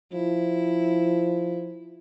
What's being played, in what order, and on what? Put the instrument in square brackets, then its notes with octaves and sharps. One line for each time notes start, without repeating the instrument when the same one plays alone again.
[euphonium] F3 [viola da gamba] E4